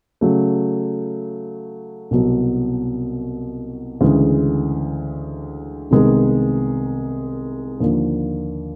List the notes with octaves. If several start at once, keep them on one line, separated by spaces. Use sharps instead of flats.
C#3 F#3 A3
C2 B2 F#3
D2 C#3 E3 G#3
C2 C3 D#3 G#3 B3
D#2 D3 F3 A#3